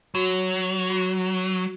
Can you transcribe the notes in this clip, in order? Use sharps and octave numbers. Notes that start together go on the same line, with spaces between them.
F#3 F#4
F#4